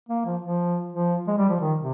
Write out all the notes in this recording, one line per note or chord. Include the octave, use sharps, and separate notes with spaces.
A#3
F3
F3
F3
G#3
G3
F3
D#3
C3